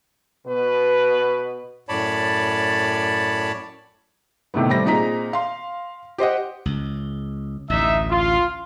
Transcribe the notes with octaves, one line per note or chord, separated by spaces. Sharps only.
B2 B4
F#2 A2 C#5 D5 A5 B5
A2 C3 D#3 A3 B3
G3 A3 C4 A#6
A#2 C4 D#4 G#4 A#5 B6
F5 C6
G4 C5 D#5 F#5
C#2
A1 D2 D#4 E5
F4